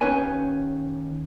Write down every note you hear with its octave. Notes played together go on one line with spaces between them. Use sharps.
D#2 C#4 D#4 B4 C#5 G#5